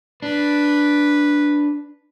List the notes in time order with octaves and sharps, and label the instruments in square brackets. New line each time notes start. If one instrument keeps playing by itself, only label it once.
[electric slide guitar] D4 [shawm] B4